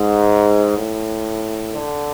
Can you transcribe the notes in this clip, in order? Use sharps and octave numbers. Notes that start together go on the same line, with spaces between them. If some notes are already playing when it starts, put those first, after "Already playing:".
Already playing: G#2
A2
D3